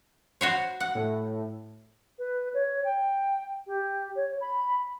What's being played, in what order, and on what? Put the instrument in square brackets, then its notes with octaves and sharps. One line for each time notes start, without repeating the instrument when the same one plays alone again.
[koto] F#4 C5 C#5
F#5
[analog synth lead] A2
[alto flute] B4
C#5
G5
G4
C#5
B5